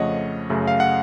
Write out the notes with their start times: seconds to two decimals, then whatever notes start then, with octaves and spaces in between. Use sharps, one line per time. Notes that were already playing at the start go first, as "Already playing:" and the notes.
Already playing: F2 C#3 F3 A3 C#5 D#5 F#5
0.50 F#2 C#3 A3
0.68 F5
0.80 F#5